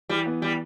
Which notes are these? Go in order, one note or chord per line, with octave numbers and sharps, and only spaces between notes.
E3 G3
B3
E3 G3